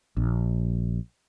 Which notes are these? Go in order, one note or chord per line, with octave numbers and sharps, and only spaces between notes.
A#1